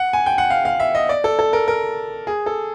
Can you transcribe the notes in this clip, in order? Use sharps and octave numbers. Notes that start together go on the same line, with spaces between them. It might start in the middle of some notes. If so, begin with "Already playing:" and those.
Already playing: F#5
G#5
G5
F#5
F5
F5
E5
D#5
D5
A4
A4
A#4
A#4
G#4
A4